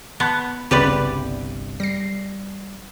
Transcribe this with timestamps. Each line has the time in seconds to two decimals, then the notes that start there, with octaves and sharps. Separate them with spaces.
0.20 B3 A5 B5 F#6
0.71 G1 C2 C#3 B3 G4 B4 D5 B5
1.80 G3 A#6 C7